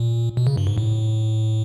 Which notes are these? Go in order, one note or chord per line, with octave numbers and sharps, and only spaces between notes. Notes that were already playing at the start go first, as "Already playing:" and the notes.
Already playing: A#2
B2
C#3
G2
G#2
A2